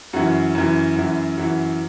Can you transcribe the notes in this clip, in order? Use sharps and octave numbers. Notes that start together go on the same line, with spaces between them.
F#2 E3 F#4
F#2 E3
F#2 E3
F#2 E3 F#4